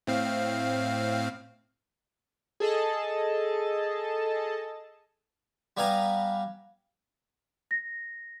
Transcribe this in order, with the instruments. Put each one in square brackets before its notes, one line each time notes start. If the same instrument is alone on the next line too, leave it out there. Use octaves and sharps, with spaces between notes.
[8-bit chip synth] A2 C4 F5
[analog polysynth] G#4 A4 D#5 A5
[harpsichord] G3 B3 F5 G#5 A#5
[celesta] A#6